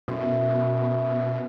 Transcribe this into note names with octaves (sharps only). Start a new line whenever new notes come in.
F#2 B2 E4 C5